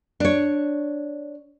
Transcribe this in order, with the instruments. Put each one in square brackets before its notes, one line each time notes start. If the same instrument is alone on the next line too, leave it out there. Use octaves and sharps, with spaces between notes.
[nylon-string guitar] D4 C#5